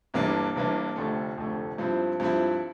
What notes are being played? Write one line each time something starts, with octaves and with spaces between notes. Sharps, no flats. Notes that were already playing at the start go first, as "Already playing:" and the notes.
G1 G2 E3 A#3 D4
G1 G2 E3 A#3 D4
F1 F2 D3 A3
F1 F2 D3 A3
G2 F3 C4 E4
G2 F3 C4 E4